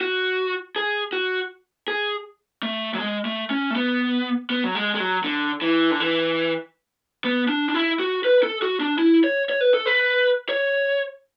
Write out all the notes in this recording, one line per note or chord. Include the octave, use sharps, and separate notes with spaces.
F#4
G#4
F#4
G#4
A3
F#3
G#3
A3
C#4
A3
B3
B3
F#3
G#3
G#3
F#3
D3
E3
D3
E3
B3
D4
D4
E4
F#4
B4
A4
F#4
D4
E4
C#5
C#5
B4
A4
B4
C#5